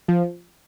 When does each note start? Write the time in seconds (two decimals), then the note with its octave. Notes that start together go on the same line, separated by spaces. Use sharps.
0.08 F3